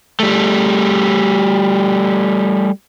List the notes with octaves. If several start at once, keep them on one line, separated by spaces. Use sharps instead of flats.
G3 A3